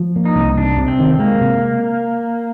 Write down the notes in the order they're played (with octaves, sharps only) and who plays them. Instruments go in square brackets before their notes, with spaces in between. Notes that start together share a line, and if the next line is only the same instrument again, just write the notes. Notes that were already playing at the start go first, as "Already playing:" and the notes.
Already playing: [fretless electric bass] F3
A#3
[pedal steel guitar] D#4
[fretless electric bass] C2
[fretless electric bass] C3 [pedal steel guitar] D4
[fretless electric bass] C3
[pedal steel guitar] C4
[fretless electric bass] D#3
[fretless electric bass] G#3 [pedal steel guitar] A#3
[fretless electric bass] C3